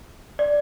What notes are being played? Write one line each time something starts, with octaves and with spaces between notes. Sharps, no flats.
D5